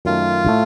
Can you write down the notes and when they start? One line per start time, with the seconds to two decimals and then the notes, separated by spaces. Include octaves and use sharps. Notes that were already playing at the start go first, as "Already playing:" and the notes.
0.05 F#2 D#3 A3 F4
0.47 A2 A3